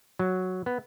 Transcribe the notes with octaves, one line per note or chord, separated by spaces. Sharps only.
F#3
B3